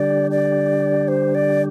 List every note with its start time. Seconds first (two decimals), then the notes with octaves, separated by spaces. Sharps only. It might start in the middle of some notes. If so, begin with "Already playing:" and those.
Already playing: D3 G3 D4 G4 D5
0.31 D5
1.08 C5
1.35 D5